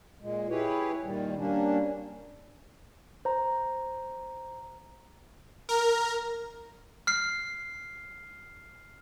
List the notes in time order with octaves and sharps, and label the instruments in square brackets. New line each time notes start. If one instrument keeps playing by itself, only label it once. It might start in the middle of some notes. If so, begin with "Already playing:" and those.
[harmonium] A#2 G#3
E4 G4 G#4 B4 C#5
A#2 D#3 G3
G3 A#3 C#4 D4
[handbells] C5 A#5
[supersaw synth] A#4
[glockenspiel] F6 C7